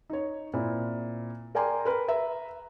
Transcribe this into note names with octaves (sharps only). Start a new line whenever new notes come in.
D#4 C#5
A#2 C4 E4
A#4 D5 G5 G#5 A#5 C6
A#4 B4
B4 E5 A#5